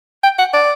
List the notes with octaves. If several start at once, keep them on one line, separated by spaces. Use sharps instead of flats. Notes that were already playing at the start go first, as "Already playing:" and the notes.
G5
F#5
D5